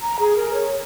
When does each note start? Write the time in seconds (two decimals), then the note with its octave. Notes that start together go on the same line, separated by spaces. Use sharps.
0.02 A#5
0.19 G#4
0.36 A#4
0.53 C#5